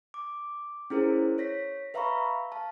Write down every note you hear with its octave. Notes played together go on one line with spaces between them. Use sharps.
D6
C#4 E4 G#4 A#4 C5
C#5 A#6 B6
B4 E5 F5 A#5 B5 C#6
F5 A5